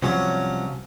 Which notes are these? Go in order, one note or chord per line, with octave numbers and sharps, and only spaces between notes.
C2 C3 F3 F#3 C#4